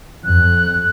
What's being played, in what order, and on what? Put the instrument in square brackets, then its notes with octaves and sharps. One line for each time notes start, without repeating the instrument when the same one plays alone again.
[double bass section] F2 [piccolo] F#6